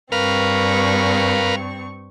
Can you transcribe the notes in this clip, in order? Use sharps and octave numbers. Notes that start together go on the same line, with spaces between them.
G2 C4 A#4 B4 F5 C#6